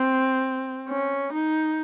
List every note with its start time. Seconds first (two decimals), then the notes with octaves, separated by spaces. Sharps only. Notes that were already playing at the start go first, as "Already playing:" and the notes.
Already playing: C4
0.89 C#4
1.33 D#4